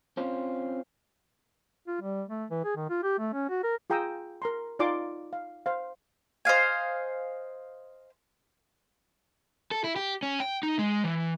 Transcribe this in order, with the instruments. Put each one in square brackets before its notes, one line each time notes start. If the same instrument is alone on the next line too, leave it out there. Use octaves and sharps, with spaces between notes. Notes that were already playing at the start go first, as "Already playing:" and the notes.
[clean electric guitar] C4 C#4 F4
[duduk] F4
G3
A3
E3
G#4
D#3
F4
G4
A3
C#4
F#4
A#4
[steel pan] F4 G#4 G5 A#5 D#6 E6
A#4 A#5 C6
D#4 F4 D5 G#5 C6 D6
F5
C5 F5
[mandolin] C5 D#5 F5 G#5
[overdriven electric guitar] A4
E4
G4
C#4
G5
D#4
G#3
E3